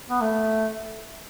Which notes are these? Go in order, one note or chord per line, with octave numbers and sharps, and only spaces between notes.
B3
A3